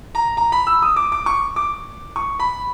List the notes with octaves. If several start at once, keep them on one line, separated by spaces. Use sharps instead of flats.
A#5
A#5
B5
E6
D#6
D6
D6
C#6
D6
C#6
B5